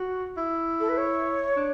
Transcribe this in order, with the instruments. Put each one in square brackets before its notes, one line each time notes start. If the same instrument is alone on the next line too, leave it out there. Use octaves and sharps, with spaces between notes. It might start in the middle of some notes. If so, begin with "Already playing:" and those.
Already playing: [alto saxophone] F#4
E4
[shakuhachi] A4
B4
C#5
[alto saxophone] D4